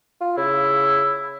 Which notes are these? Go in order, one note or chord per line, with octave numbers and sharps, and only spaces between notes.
F4
C#3 E4